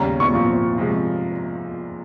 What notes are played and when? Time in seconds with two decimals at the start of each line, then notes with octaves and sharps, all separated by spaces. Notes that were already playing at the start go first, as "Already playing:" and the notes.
Already playing: D#2 C#3 G3 C#4 A#5
0.20 C#6
0.31 A#2 F3 C4
0.78 C3 F3 G#3